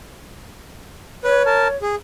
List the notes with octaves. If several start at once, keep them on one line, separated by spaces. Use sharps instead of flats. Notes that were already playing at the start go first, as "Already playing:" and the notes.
B4 C#5
A#4 A5
G#4